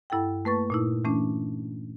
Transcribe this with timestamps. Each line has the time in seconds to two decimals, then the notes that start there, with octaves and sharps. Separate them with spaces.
0.10 G2 E4 A4 F#5 G5
0.45 A3 A#3 B4 A5 C#6 A6
0.70 A#2 D#4 E4
1.04 E3 A3 C#4 D4